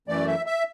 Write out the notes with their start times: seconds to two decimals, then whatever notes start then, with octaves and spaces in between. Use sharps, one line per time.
0.08 F#2 E3 A3 D5
0.27 E5
0.46 E5